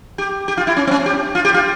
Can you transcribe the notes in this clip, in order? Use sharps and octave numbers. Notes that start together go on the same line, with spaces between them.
G4
G4
F4
E4
C#4
C4
C#4
G4
F4
G4
F4